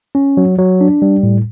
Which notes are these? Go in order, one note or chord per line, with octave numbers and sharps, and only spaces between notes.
C#4
F#3
F#3
D4
G3
A2